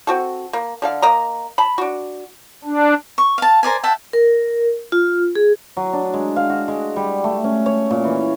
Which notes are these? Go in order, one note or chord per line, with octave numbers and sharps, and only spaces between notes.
C4 F#4 A4
A#3
D3 A4 F5
A#3 D#5 A#5
A5 B5
D4 F#4
D4
C#6
F5 A5
A#4 C5 D5 G#5
E5 F#5 G5 A5
A#4
F4
G#4
F#3
D4
G#3
F5
F#4
G#3
G3
A3
C#4
C#5
A#2
E3